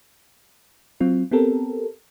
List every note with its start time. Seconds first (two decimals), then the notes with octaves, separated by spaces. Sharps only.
1.00 F#3 C4 F4
1.31 B3 C4 G4 A4 A#4